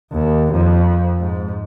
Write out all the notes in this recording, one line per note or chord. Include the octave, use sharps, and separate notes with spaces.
D#2
F2
G#2